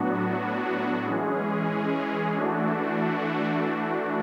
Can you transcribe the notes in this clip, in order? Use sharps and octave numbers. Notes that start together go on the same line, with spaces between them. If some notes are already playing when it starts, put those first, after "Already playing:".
Already playing: A2 F#3 B3 D4 F#4
E3 G#3 C#4 G#4
E3 A3 D4 F#4